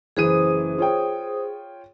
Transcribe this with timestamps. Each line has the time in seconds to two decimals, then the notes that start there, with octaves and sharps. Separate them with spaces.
0.17 F#1 E3 G#4 C5 D#6 D#7
0.78 F4 C#5 G5